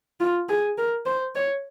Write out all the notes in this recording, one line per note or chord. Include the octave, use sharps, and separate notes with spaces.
F4
G#4
A#4
C5
C#5